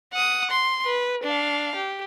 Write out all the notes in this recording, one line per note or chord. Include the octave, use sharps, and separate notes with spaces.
F#5 D#6
C6
B4
D4 F5
G4